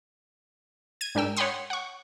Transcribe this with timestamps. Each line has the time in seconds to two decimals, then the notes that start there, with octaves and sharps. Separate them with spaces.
1.01 G#6 D#7
1.15 G#2 D4 A#4 G5 E6
1.37 C#5 F#5 G5 B5 C6 D#6
1.70 F#5 C#6